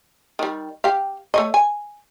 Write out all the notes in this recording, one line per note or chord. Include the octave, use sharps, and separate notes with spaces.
D#3 G3
G4 F5
A3 C#5 D#5
G#5